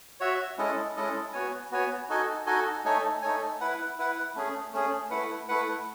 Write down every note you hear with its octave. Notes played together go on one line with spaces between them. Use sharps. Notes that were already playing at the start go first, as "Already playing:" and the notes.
F#4 C#5 E5
G#3 C#4 E4 A4 D#5
G#3 C#4 E4 A4 D#5
B3 F#4 C#5 G#5
B3 F#4 C#5 G#5
D#4 F#4 A4 D#5 G#5
D#4 F#4 A4 D#5 G#5
A3 D#4 A4 C#5 G#5
A3 D#4 A4 C#5 G#5
E4 B4 F#5
E4 B4 F#5
A3 C#4 G#4
A3 C#4 G#4
A3 E4 B4 F#5
A3 E4 B4 F#5